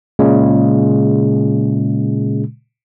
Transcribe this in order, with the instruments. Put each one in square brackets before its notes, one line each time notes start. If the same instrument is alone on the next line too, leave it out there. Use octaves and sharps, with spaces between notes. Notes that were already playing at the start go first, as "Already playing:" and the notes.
[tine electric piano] A#2 C#3 G#3